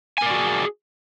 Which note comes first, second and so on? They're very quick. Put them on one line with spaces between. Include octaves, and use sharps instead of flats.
G#5 A#4 D5 F#4 G#4